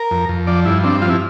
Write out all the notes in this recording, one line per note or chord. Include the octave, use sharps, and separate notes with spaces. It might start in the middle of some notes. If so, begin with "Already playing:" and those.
Already playing: A#4
F2
F2
F3 D5
G2 E4
C4 D4
F3 F4
E4